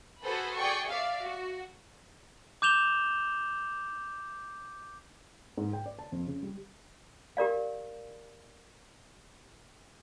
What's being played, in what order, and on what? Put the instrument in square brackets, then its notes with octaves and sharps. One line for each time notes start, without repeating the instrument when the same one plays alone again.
[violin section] F#4 G#4 A4 B4 C5 B5
G#4 D5 G5 C#6
D5 E5 F5
F#4
[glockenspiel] D6 G6 E7 F7 G7
[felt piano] G#2
G5
D5
A5
F2
C#3
G3
[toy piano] G4 A#4 D5 F5